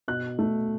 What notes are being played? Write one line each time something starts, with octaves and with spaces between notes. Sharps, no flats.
B2 F#6
A3